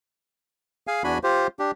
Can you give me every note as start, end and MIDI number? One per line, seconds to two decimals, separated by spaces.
0.87 1.03 68
0.87 1.03 77
0.87 1.03 80
1.04 1.18 40
1.04 1.18 62
1.04 1.18 66
1.04 1.18 80
1.04 1.18 83
1.24 1.47 65
1.24 1.47 67
1.24 1.47 72
1.59 1.71 62
1.59 1.71 67